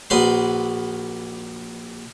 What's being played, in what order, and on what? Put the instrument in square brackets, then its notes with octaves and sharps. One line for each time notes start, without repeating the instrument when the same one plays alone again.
[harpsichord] A#1 F#4 B4 C6